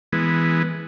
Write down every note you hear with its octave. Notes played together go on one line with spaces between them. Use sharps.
E3 G#3 B3